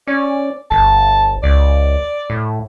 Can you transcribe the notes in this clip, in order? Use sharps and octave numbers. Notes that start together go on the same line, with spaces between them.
C#4 D5
G1 A5
C#2 D5
A2